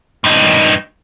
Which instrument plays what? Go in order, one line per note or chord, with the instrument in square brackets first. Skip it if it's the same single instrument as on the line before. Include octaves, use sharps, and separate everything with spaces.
[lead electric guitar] G2 D#4